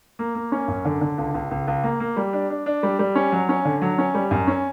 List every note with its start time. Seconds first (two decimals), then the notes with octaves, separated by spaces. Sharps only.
0.19 A#3
0.35 A#3
0.52 C#4
0.68 F#2
0.85 D3
1.01 D3
1.18 C#2
1.34 C#2
1.51 C#2
1.68 C#2
1.84 A#3
2.00 A#3
2.17 G3
2.33 D4
2.50 D4
2.66 D4
2.83 G3
2.99 G3
3.15 C#4
3.32 F#3
3.49 C#4
3.65 D3
3.81 F#3
3.98 C#4
4.14 G3
4.31 F#2
4.47 C#4